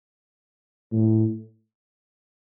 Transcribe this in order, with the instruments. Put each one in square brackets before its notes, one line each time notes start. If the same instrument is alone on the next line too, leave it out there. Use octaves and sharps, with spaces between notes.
[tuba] A2